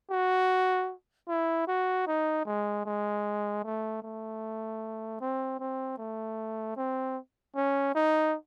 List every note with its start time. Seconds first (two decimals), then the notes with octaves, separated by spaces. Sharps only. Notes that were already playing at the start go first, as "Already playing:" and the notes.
0.11 F#4
1.28 E4
1.68 F#4
2.07 D#4
2.45 G#3
2.85 G#3
3.64 A3
4.02 A3
5.21 C4
5.59 C4
5.98 A3
6.77 C4
7.56 C#4
7.95 D#4